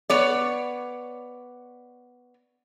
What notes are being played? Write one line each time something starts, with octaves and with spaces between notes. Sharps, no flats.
B3 C#5 D5